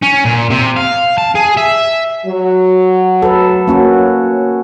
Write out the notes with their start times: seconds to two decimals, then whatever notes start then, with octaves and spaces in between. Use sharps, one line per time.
0.02 C#4
0.25 A#2
0.51 C3
0.77 F5
1.18 A5
1.35 G#4
1.57 E5
2.26 F#3
3.22 A4 B4
3.68 A#3 C#4 F#4